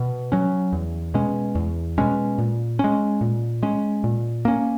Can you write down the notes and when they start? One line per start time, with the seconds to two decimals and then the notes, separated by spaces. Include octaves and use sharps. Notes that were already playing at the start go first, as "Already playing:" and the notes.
Already playing: B2
0.32 F#3 C#4
0.73 E2
1.14 B2 G#3 C#4
1.55 E2
1.98 B2 G#3 C#4
2.38 A#2
2.79 G#3 C#4
3.21 A#2
3.63 G#3 C#4
4.04 A#2
4.45 A#3 C#4